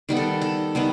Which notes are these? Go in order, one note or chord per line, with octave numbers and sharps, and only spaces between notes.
D#3 G3 B3
A4
A4
D#3 G3 B3